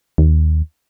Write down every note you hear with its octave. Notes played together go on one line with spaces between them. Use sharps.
D#2